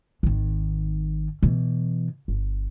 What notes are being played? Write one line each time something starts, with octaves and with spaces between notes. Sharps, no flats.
G#1 D#3
B2 E3
G1